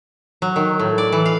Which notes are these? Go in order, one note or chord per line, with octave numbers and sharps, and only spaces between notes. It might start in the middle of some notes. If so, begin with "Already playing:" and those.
F#3
D#3
A2
D5
E3
F5